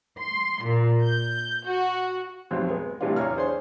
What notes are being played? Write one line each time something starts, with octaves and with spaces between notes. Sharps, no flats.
C6
A#2
G6
F#4
B1 F2 G#2 F#3 G3 C4
G#3 B3
A2 C3 E3 G3 D4 F4
E2 F4 C#5 F5 A#5 F6
D4 G#4 C5 C#5 C6